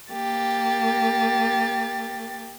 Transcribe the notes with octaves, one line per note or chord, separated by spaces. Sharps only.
A#3 G4 A6